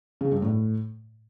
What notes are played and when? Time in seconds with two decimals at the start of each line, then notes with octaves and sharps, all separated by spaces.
0.21 C#3
0.32 G2
0.42 A2